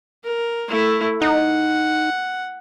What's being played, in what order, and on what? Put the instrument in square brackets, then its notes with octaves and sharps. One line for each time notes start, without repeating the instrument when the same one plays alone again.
[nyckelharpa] A#4
A3 E4
[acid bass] D#4 [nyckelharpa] F#5